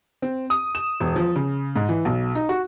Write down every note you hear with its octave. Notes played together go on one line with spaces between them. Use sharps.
C4
D#6
E7
E1
F3
C#3
G#2
E3
B1
D#4
F#4